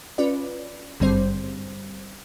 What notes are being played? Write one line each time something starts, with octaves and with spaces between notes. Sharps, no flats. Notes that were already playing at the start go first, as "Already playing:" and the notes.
C#4 F4 B4 D5
G#1 G2 D3 G3 C4 C5